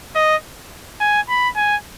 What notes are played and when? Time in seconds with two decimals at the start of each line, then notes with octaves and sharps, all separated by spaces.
0.16 D#5
1.01 G#5
1.29 B5
1.56 G#5